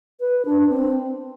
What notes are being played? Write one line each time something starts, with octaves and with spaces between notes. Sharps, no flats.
B4
D4
C4